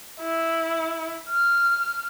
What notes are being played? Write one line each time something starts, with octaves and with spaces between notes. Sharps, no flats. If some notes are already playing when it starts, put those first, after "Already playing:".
E4
F6